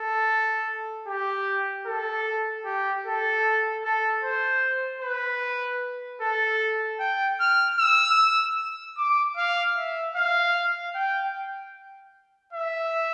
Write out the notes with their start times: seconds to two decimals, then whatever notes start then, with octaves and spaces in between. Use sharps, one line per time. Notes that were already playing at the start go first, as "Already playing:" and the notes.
Already playing: A4
1.07 G4
1.86 A4
2.65 G4
3.05 A4
3.84 A4
4.23 C5
5.02 B4
6.21 A4
7.00 G5
7.40 F6
7.79 E6
8.97 D6
9.37 F5
9.76 E5
10.16 F5
10.95 G5
12.53 E5